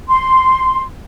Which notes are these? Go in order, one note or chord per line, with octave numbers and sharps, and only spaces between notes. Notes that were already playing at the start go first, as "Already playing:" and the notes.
C6